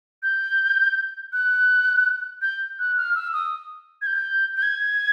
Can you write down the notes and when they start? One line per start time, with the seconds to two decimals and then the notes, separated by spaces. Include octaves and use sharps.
0.23 G6
1.33 F#6
2.42 G6
2.79 F#6
2.97 F6
3.15 E6
3.33 D#6
4.02 G#6
4.07 G6
4.57 G6
4.63 G#6